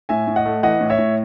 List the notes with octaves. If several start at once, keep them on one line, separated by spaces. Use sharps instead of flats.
A2 E5 G#5
A2
D#5 F#5
A3
E3 D#5 F#5
A2
C#5 E5
A2